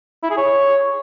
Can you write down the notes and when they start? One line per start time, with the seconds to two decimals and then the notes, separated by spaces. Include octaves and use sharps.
0.23 E4
0.30 G#4
0.38 C#5